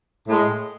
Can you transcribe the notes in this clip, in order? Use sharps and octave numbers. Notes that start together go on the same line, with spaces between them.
A2 G#3